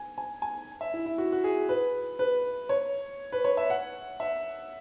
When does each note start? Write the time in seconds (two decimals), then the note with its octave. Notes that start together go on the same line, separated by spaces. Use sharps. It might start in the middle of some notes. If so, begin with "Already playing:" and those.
Already playing: G#5
0.18 G#5
0.42 G#5
0.81 E5
0.94 E4
1.06 E4
1.18 F#4
1.32 F#4
1.44 G#4
1.69 B4
2.19 B4
2.69 C#5
3.32 B4
3.44 C#5
3.57 E5
3.70 F#5
4.20 E5